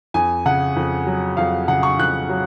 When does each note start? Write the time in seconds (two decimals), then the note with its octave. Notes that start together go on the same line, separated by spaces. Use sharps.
0.14 F2 G#5
0.46 C#3 F#5
0.76 F2
1.07 F#3
1.37 F2 F5
1.68 C#3 F#5
1.83 C#6
1.99 F2 F#6
2.29 F#3